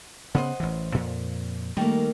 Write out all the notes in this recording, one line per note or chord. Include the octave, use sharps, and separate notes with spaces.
C#3 B3 C5 D#5 F#5
A1 E3
F2 A#2 F3
D#3 G3 A3 A#3